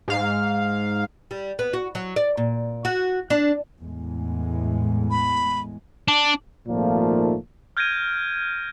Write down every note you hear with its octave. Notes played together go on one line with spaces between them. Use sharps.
G#2 F5
G3
B3
F#4
F#3
D5
A#2
F#4
D4
E2 A2 G#3
B5
D4
G#1 D#2 A#2 F3 A3 A#3
F6 G6 G#6 A#6 D7 D#7